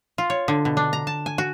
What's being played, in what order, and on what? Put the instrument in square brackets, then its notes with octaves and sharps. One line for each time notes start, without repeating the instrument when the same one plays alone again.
[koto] F4
C#5
D3
B2
D4
A#5
A5
G#5
F#4